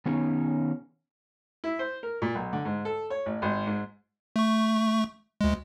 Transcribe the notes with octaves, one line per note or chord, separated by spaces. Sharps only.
D#3 B3 C#4 D#4 C#5
E4
C5
A#4
A#2
B1
D3
G#2
A4
C#5
A1
G#1
G#2
A3 C#6
D2 G#3